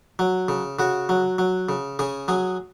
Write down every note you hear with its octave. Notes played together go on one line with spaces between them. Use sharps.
F#3
C#3
C#3 F#4
F#3
F#3
C#3
C#3 G#4
F#3 G#4